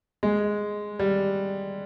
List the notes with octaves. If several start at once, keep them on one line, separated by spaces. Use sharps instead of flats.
G#3
G3